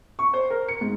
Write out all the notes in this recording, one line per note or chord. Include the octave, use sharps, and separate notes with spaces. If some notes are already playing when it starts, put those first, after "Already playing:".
C#6
C5
A#4
C#7
G#2